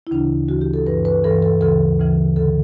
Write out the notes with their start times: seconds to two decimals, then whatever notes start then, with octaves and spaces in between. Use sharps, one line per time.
0.07 E4
0.11 D2 C#3 E3 D4
0.49 D2 C#3 E3 F#4
0.61 G4
0.74 A4
0.87 G2 E3 B4
1.05 B4
1.24 G2 E3 A4
1.43 A4
1.61 D2 C#3 E3 A4
2.00 D2 C#3 E3
2.36 D2 D3 A4